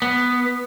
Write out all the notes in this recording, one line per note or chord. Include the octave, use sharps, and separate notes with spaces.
B3